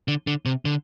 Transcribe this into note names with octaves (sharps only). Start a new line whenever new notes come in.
D3
D3
C3
D3